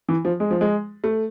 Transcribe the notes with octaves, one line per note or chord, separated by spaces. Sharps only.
E3
F3
G#3
F3
G#3
A3